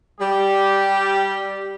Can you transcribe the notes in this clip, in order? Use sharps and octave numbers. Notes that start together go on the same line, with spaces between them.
G3 G4